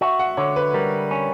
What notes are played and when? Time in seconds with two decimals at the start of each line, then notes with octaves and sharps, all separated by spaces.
0.01 F#4 E5
0.19 F#5
0.37 D3 C#5
0.56 B4
0.74 G3 A#4
1.11 C#4